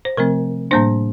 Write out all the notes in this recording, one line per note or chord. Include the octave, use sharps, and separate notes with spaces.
C5
C3 F3 A3 C4 A#4
A2 G3 A#3 D4 C5